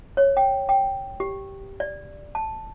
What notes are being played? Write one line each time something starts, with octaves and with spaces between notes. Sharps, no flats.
C#5
G5
G5
G4
D5
A5